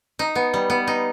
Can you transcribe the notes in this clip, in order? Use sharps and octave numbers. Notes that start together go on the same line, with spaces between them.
D#4
B3
G3
B3
D#4